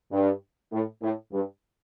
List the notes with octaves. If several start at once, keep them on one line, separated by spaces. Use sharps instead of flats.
G2
A2
A2
G2